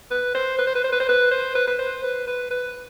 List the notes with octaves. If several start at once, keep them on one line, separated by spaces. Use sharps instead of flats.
B4
C5
B4
C5
B4
C5
B4
C5
B4
C5
B4
B4
C5
B4
B4
B4